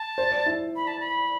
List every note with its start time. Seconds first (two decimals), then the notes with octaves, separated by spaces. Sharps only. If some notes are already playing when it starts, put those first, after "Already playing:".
Already playing: A5
0.18 C5
0.32 D5
0.46 E4
0.76 B5
0.87 A5
1.00 B5